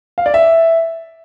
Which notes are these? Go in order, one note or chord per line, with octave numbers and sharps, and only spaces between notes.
F5
D5
E5